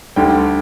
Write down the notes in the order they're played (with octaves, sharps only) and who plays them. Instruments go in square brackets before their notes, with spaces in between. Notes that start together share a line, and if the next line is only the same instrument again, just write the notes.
[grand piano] D2 D3 G3 G5